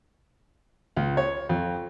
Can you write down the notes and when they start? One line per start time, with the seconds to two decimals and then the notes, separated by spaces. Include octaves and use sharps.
0.97 C#2
1.17 C#5
1.49 F2